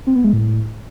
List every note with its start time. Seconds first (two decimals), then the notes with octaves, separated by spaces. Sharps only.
0.07 C4
0.16 B3
0.24 G#3
0.33 A2